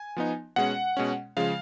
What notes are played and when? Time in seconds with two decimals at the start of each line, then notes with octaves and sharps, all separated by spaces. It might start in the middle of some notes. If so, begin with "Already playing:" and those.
Already playing: G#5
0.16 F3 B3 D#4
0.56 B2 G#3 C#4 F#5
0.97 B2 G#3 C#4
1.37 C#3 F3 G#3 F5